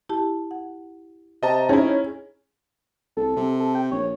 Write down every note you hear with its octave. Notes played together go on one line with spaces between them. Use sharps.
E4 G4 A5
F#5
C3 D#5 A5 A#5
C#4 D#4 E4 G#4
C2 A4
C3
A4
G5
A#1 C#5